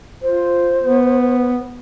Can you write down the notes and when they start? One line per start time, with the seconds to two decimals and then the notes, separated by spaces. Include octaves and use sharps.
0.22 F4 C5
0.82 B3